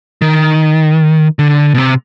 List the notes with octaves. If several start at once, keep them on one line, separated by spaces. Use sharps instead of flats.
D#3
D3
B2
C3